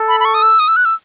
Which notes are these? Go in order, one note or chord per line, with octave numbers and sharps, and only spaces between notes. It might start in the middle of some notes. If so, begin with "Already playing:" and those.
Already playing: A4
B5
B5
C#6
D#6
E6
D#6
E6
F#6
E6